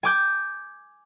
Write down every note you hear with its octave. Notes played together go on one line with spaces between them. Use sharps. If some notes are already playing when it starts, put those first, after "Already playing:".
G#5 D6 G6